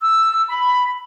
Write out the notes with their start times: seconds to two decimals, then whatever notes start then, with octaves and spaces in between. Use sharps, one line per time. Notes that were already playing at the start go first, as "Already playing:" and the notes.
0.01 E6
0.49 B5